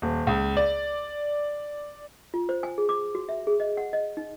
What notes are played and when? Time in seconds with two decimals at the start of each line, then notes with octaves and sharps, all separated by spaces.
0.02 D#1
0.27 C#2
0.57 D5
2.34 F4
2.49 C5
2.63 G#5
2.78 G#4
2.89 D6
3.15 F#4
3.29 E5
3.47 G#4
3.60 D#5
3.77 F#5
3.93 D#5
4.17 D#4